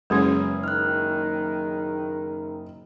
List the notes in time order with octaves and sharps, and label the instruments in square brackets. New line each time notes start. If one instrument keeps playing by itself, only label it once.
[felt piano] F#1 G#4 [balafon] G#3 C#4 C#5 [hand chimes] B4 D#6 G#6
[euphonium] D#3 [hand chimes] F6 F#6